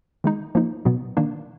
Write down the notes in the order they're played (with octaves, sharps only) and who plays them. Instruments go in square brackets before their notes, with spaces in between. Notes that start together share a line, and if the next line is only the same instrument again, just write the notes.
[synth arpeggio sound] D#3 G#3 D#4
F3 A#3 D#4
B2 F#3 B3
D#3 A#3 D4